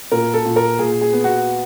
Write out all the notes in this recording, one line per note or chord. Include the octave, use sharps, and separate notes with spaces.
A#2 A#4
A4
A#2
A#4
A#2 G#4
G#4
B3
F#4